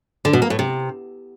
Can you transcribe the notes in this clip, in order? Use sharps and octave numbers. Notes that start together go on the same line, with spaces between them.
D3
B2
A#3
A2
C3